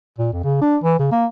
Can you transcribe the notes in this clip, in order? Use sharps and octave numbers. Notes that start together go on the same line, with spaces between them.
A#2
F2
C#3
D4
E3
C#3
A#3